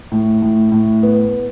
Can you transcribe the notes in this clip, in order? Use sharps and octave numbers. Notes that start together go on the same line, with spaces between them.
A2
A2
A2
B3